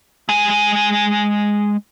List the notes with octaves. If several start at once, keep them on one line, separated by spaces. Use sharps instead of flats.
G#3 G#5